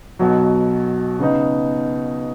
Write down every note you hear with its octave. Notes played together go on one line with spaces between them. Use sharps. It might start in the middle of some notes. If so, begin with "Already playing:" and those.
B1 B2 F#3
C#3 B3 D#4